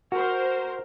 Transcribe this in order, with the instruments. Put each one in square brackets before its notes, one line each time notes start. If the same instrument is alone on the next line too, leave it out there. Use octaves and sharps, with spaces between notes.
[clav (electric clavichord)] F#4 [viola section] A#4 C5